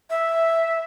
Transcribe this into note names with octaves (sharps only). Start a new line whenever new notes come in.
E5